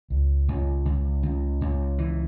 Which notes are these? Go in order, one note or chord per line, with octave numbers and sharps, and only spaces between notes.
C#2
C#2
C#2
C#2
C#2
E3